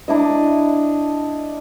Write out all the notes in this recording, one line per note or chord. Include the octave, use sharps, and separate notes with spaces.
D4 E4 D#5